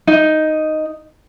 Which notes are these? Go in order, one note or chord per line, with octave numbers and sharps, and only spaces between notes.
D#4